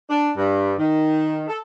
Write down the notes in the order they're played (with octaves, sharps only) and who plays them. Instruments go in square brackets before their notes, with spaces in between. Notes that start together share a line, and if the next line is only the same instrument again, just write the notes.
[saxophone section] D4
G2
D#3
A4